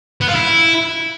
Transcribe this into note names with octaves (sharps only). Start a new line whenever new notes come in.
B3
F4
E4